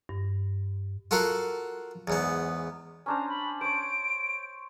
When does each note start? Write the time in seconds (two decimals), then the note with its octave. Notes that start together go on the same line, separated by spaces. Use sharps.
0.09 G2
1.11 F4 F#4 A4 A#4 F5 F#5
2.08 E2 G#2 B3
3.06 C#4 D4 C5 A#5
3.29 B5
3.61 C5 C#5 D7